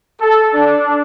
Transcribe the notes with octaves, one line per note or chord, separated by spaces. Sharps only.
A4
D4